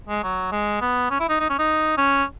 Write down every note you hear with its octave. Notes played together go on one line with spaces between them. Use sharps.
G#3
F#3
G#3
B3
C#4
E4
D#4
D#4
C#4
D#4
C#4